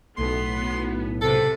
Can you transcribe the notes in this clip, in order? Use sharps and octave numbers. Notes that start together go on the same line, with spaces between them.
B1 A2 B3 C6
C#2 C3 A4 B4